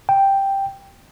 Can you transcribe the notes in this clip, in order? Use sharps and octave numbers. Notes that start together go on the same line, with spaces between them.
G5